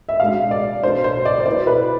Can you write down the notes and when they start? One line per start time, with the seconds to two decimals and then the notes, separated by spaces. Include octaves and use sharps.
0.09 E5
0.20 B2 G#3 D4 F5
0.51 D5
0.83 B2 B3 D4 C5
1.04 C5
1.25 D5
1.40 C5
1.46 B2 B3 E4 D5
1.67 B4